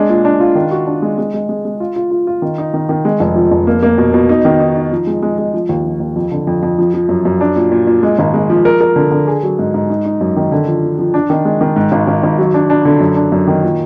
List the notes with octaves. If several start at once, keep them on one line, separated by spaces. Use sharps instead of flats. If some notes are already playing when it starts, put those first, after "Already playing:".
Already playing: G#3 D4
A#2
D4
F4
D#3
F#4
D4
G#3
G#3
G#3
G#3
G#3
F4
F4
F4
F4
D#3
D#4
D#3
D#3
G#3
F1
F3
F1
A#3
A#3
B2
B2
D#4
D#3
D#4
D#4
F3
G#3
G#3
G#3
F3
D#2
F3
D#2
F2
D3
F2
F2
F3
F3
F#2
F#2
D4
A#2
A#2
A#2
G#3
G#1
G#3
F3
A#4
A#4
D3
D3
G#4
F#3
G#2
G#2
D#4
D#4
F#2
D#3
D3
F3
F3
F3
D4
D#3
G#3
D#3
G#2
G#1
G#1
G#1
F#3
D4
D4
D3
F#2
D4
F#2
D#3
A#2